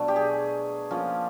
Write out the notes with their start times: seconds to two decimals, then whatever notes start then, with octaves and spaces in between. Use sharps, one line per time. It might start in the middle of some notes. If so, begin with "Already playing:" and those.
Already playing: B2 F#3 A3 D4
0.08 G4
0.16 G#4
0.91 F3 A#3 C#4